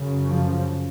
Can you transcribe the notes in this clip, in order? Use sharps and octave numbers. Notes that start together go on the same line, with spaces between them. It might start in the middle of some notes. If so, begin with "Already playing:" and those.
Already playing: F#2 C#3
F3